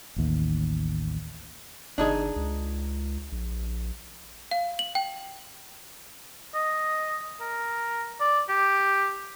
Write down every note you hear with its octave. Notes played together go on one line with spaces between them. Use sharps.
A1 D#2
G1 D4 D#4 G#4
C#2
A#1
F5
F#7
G5
D#5
A#4
D5
G4